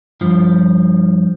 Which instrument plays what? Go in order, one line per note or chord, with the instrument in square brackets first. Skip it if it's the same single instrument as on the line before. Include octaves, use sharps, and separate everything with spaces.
[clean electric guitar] G2 F3